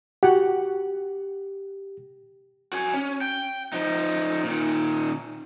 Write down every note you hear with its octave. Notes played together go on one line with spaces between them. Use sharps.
F#4 G4 F#5
F#4 G#5
C#4
G5
F3 D#4
A#2 D#3